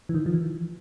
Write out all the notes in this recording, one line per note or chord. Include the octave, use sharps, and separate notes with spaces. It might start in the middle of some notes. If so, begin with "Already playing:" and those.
E3
D#3
F3
E3